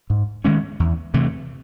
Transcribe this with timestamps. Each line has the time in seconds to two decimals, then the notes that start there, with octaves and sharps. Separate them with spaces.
0.10 G#2
0.45 D#3 G#3 C#4
0.80 E2
1.14 C3 E3 A3